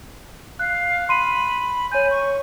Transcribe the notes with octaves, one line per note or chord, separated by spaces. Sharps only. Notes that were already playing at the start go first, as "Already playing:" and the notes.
F5 F#6
B5 C6 D#7
C#5 G#5 G6
C#6